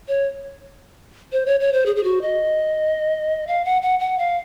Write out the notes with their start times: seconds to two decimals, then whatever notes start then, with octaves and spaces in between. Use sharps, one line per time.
0.08 C#5
1.32 C5
1.46 C#5
1.60 C#5
1.73 C5
1.86 G#4
1.96 G#4
2.04 F#4
2.22 D#5
3.47 F5
3.65 F#5
3.82 F#5
4.00 F#5
4.18 F5